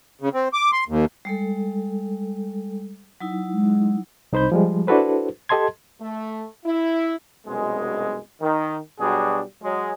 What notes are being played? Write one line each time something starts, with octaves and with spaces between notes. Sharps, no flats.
C#3
C4
D6
C6
D#2
G3 G#3 A4
F#3 D#4 E4
G#3
C2 D#4 C5 B5 G6
F3 G3 G#3
D4 E4 F#4 A4 B4 C5
G4 A4 D#5 A5 C6 G#6
A3
E4
C2 F#2 B2 G#3
D#3
B2 F#3 G3 D4 F#4 G#4
F#3 G#3